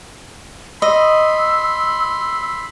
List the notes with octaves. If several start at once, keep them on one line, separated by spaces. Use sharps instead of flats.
D#5 B5 C6 E6